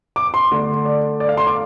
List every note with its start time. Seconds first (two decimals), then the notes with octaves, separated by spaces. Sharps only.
0.16 D6
0.34 C6
0.51 D3 A3 D4
0.85 D5
1.20 D5
1.29 F5
1.37 C6
1.47 D6